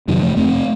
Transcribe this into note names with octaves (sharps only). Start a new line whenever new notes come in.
F2 C3 D#3 F#3
F3 A3
F2 C3 A3 C4